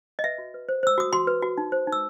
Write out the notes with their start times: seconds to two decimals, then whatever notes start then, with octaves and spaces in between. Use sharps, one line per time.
0.19 D#5
0.24 B4 E5
0.38 F#4
0.54 B4
0.69 C5
0.83 C5 E6
0.98 F#4 D#6
1.13 F#4 C6
1.27 B4
1.42 F#4
1.58 D#4
1.72 C5
1.87 D#4
1.92 E6